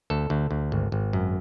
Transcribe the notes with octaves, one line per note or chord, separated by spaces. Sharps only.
D2 A4
D2
D2
G#1
G#1
F#2